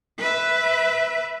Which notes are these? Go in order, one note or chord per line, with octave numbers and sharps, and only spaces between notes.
B4 E5